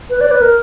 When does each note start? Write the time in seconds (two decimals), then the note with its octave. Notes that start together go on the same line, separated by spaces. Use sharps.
0.10 B4
0.21 D5
0.31 B4
0.41 A#4